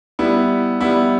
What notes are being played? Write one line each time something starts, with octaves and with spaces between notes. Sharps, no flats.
G3 B3 E4
G3 B3 E4